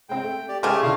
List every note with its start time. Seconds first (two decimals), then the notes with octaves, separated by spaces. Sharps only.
0.09 G#3 C4 G5
0.23 A3
0.48 G4 D5
0.63 C#3 G#3 A3 G4 G#5 A5 D6
0.83 B2 D3 D4 E4 F4 F5